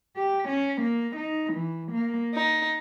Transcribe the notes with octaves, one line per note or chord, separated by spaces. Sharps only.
G4
C#4
A#3
D#4
E3
A#3
D#4